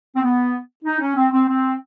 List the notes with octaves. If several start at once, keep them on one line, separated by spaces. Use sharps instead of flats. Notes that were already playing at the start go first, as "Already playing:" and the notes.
C4
B3
D#4
C#4
C4
C4
C4